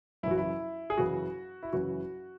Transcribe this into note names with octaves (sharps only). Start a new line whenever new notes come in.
F#2 C#3 E3 E4 F#4
E4
G#4
F#2 C#3 E3 F#4
E4
F#2 C#3 E3 F#4